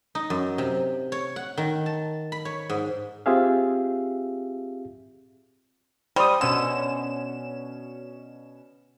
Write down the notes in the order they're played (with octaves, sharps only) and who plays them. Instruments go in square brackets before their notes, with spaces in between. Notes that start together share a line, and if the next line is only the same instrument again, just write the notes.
[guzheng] D#4
F#2
C3
C#5
F#5
D#3
A5
B5
C#5
G#2
[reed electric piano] C4 F4 G4 G#4 E5 F5
[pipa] G3 [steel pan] C5 D#6
[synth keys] B2 C#4 E7 [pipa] D3